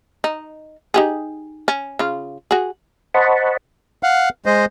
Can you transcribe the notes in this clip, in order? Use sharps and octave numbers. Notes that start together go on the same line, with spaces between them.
D#4
D#4 G4 G#4
C#4
C#3 F4
F#4 G#4
C5 D#5 F#5 A5 B5 C#6
F5 F#5
G#3 C5 D#5